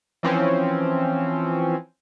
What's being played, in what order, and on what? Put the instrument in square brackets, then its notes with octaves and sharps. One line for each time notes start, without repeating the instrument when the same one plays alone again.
[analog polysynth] E3 F3 C4 C#4